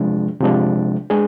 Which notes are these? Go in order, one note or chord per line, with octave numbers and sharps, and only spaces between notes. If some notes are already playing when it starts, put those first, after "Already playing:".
Already playing: C3 F3 G#3 D4
C3 F3 G#3 D4
G#3 D4 G#4